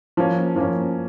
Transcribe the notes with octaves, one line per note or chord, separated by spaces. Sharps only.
F3 A#3 C#4
F3 A#3 C#4